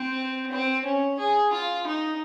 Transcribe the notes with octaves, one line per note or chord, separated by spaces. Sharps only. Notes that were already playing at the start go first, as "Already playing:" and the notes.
Already playing: C4
C4
C#4
G#4
F4
D#4